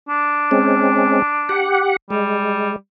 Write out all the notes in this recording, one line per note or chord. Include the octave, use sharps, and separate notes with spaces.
D4
G#3 C4 C#4
G4 F#5
G3 G#3